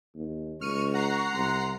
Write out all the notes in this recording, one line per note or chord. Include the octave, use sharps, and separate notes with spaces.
D#2
C#2 C#6 F6 C#7 D#7
F#5 A#5 C7
C2 C6